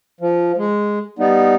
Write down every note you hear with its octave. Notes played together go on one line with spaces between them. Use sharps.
F3
G#3
G3 B3 D#4